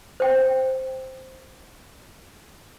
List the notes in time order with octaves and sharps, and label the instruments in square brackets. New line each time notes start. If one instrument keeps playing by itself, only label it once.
[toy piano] C5 G5